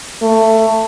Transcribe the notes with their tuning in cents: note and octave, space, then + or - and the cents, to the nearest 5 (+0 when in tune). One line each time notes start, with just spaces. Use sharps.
A3 +15